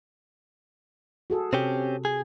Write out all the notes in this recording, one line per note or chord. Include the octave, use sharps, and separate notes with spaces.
F#4 G#4 A4
C3 C4 C#4 G4
G#4